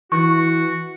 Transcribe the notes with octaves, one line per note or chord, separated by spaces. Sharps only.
E3 F#4 C#6